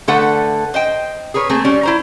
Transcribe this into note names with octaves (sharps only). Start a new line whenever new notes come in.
D3 A3 A4 B4 F#5
C5 D#5 G5
G#4 A#4 B4 C#5
A3 A#3 C4 G#4
G3 C#4
E4 C5 A#5